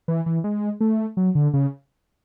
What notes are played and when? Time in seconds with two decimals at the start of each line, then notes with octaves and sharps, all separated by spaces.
0.08 E3
0.26 E3
0.44 G#3
0.81 A3
1.17 F#3
1.35 D3
1.54 C#3